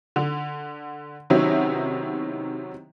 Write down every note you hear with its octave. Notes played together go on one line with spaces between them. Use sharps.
D3
C3 D#3 F#3 B3 C#4 E4